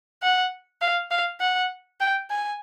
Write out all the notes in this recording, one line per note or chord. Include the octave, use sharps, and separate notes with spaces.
F#5
F5
F5
F#5
G5
G#5